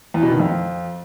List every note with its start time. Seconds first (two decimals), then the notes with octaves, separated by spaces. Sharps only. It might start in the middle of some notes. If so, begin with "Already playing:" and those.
0.14 E2
0.23 B2
0.31 D#3
0.40 F2